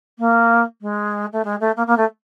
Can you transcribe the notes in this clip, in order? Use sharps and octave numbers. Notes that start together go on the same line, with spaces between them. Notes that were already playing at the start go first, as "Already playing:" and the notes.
A#3
G#3
A3
G#3
A3
A#3
A#3
A3